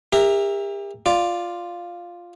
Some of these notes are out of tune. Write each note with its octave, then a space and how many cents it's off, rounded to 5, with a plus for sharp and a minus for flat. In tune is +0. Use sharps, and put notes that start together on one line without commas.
G4 +40 A#4 +0 E5 +0
F4 +0 D5 +5